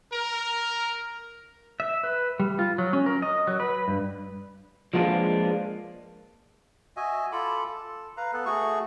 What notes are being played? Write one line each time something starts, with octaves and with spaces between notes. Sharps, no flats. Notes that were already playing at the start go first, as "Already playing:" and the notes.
A#4
E5
B4
G3
F4
F#3
C#4
A#4
D#5
F#3
B4
G2
F3 G#3 A#3 D4 F4 B4
F#4 D#5 E5 G#5
F4 A4 B5 D6
A4
B4 F5 A#5
B3 A4 B4
A3 F#4 G#4 C#6